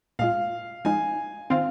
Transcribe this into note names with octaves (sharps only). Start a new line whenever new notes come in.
A#2 G#3 F4 F5
F3 G#3 D#4 G#5
D#3 C4 F4 F5